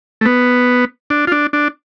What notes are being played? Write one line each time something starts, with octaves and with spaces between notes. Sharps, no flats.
A3
B3
D4
F4
D4
D4